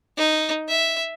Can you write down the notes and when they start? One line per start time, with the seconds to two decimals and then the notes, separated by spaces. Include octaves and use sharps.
0.18 D#4
0.68 E5